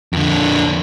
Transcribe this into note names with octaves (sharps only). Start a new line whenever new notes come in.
F2 D3